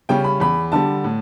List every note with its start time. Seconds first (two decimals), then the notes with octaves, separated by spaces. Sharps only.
0.09 C#3 G3 C#4 G5
0.24 B5
0.40 E2 B5
0.72 D3 G3 A5
1.04 A2